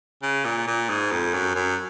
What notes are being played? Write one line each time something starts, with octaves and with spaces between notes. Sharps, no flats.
C#3
A#2
A#2
G#2
F2
F#2
F#2